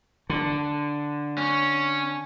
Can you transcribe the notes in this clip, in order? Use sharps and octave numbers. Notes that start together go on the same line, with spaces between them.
D3
C#4